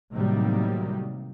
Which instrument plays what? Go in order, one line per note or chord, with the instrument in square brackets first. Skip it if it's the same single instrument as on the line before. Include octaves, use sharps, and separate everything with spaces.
[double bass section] A2 C3 D#3 F#3 G3 A#3